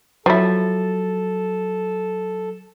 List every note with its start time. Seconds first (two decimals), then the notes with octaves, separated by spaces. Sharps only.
0.26 F3 F#3 E4 A4 A6